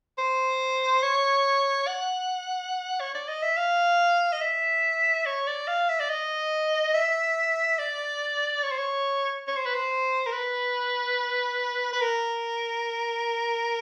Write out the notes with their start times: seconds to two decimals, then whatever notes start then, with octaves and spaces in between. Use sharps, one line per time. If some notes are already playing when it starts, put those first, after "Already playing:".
0.18 C5
1.03 C#5
1.88 F#5
3.01 C#5
3.15 D5
3.28 D#5
3.42 E5
3.57 F5
4.32 D#5
4.41 E5
5.26 C#5
5.47 D5
5.68 F5
5.89 E5
6.00 D5
6.10 D#5
6.94 E5
7.79 D5
8.63 C#5
8.71 C5
8.78 C#5
9.48 C#5
9.57 C5
9.66 B4
9.74 C5
10.26 A#4
10.32 B4
11.93 B4
12.01 A#4